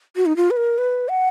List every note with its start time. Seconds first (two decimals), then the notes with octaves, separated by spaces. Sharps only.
0.16 F#4
0.26 D#4
0.37 F4
0.51 B4
0.57 A#4
0.78 B4
1.09 F#5